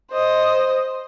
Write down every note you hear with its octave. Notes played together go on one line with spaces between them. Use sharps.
C5 D#5